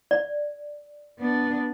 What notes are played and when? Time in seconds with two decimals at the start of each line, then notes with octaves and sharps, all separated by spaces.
0.11 D5
1.19 B3 D4